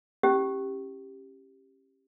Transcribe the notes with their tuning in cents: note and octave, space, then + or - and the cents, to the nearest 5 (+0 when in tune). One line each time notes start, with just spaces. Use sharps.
C#4 -30 E4 +0 G4 +0